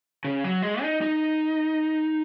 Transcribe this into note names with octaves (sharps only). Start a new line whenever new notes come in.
C#3
F#3
G#3
D#4
D#4